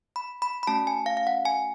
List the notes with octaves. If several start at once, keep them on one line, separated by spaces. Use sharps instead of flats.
B5
B5
B5
A3 C#4 F#4 A5
G#5
F5
F5
F#5
G#5